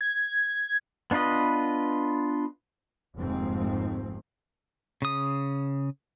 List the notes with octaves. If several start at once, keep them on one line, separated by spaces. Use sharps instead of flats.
G#6
B3 D4 F4 B4 D#5
F1 D#2 G#2 F3 C4
C#3 D#6